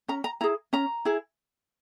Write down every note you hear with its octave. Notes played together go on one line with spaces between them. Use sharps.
C#4 A#5
A#5
E4 G#4 A#5
C#4 A#5
E4 G#4